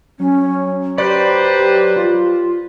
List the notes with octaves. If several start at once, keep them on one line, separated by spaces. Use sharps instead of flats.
F#3 C#4
G4 B4 C5 D5
F4